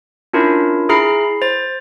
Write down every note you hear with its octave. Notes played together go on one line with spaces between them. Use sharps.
C#4 D4 E4 F4 A#4
E4 G#4 A#5 B5 F6 C7
C5 A6